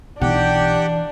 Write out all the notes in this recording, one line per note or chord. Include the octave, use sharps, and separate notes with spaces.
B1 E3 D4 G4 F#5 G5